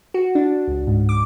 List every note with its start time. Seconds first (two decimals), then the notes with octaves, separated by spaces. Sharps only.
0.14 F#4
0.35 D4
0.68 C#2
0.87 G#2
1.09 D6